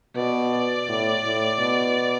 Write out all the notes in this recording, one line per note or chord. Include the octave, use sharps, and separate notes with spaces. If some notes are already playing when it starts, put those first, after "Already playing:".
B2 D5
A2
A2
B2